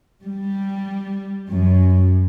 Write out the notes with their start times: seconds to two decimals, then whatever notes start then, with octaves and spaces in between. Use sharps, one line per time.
0.21 G3
1.51 F#2